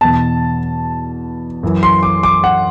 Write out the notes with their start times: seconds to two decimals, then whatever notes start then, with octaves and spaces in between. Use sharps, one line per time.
0.01 E2 B2 A5
1.63 F#2 E3
1.83 C6
2.03 D6
2.23 D6
2.44 F#5